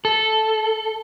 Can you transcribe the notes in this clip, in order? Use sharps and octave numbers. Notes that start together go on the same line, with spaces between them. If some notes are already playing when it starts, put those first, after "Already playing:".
A4